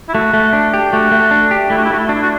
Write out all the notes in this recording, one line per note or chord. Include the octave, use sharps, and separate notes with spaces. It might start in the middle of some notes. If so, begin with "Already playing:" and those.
E4
A3 F#4
A3
D4
G4
A3 F#4
A3
D4
G4
A3 E4
F#4
E4
A3 F#4
E4
F#4
D4
E4
F#4